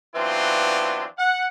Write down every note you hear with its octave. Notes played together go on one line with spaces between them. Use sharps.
E3 F#3 B3 C4 D4 F4
F#5